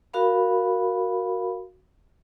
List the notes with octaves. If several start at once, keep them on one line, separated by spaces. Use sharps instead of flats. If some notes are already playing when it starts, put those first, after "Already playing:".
F#4 A#4 F5 B5